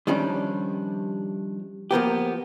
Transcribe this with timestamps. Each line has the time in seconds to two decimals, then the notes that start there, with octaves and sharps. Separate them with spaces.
0.07 D#3 F3 G3 C#4 D4
1.91 F3 A#3 B3 G4